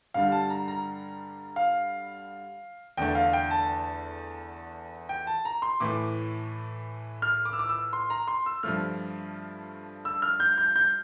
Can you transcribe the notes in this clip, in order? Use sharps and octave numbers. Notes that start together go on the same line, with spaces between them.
G2 D3 G3 F5
A5
A#5
A#5
F5
E2 D3 A3 G5
F5
G5
A5
G5
A5
A#5
C6
A2 E3 A3 D6
F6
D6
E6
D6
E6
C6
A#5
C6
E6
G2 F3 A3 F6
E6
F6
G6
G6
G6